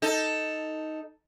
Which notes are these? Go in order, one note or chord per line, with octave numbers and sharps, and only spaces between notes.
D#4 A4